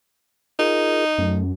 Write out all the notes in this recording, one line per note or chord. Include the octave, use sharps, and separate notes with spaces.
D#4 F4 G#4 A#4
F#2 A3